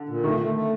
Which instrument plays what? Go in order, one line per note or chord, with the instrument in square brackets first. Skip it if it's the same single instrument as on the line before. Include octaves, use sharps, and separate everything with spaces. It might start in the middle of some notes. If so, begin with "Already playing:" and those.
Already playing: [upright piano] D3
[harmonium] A#2
[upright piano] D#3 [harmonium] A3
[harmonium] A3
A3